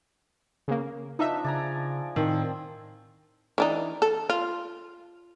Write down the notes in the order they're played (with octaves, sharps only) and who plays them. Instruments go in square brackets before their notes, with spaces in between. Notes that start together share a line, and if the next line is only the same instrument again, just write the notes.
[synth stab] C#3 A#3
[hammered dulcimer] F3 D4 [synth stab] D#4 E5
[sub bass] C#3 [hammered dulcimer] D5 G#5 A#5
[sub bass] A2 [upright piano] D#3 [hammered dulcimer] C4
[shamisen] E3 D4 D#4
A4
F4